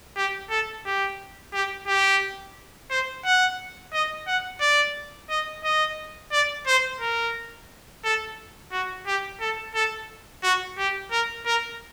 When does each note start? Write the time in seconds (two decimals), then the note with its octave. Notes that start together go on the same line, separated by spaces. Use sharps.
0.16 G4
0.50 A4
0.85 G4
1.53 G4
1.87 G4
2.90 C5
3.25 F#5
3.93 D#5
4.27 F#5
4.61 D5
5.30 D#5
5.64 D#5
6.32 D5
6.67 C5
7.01 A#4
8.04 A4
8.72 F#4
9.07 G4
9.41 A4
9.75 A4
10.43 F#4
10.78 G4
11.11 A#4
11.46 A#4